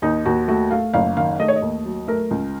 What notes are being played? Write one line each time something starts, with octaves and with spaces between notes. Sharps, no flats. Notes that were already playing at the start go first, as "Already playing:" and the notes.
D#2 D#4
D#2 F#4
A3 F#4
A3 F5
F#1 F5
D#3 F5
A3 D#5
C#5
D#5
D#2
F#3
A3 A#4
C#2